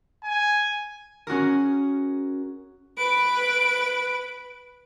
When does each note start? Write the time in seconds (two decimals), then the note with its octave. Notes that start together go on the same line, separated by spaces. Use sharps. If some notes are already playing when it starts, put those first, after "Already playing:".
0.24 G#5
1.27 C#4 F#4 G#4 A#4
2.98 B4 D7